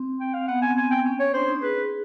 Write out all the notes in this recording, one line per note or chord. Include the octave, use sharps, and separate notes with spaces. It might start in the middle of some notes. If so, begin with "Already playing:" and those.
Already playing: C4
G5
F5
B3 F#5
C4 G#5
C4 G#5
G5
C#4
C#5
D4 C5
D#4
G#4 B4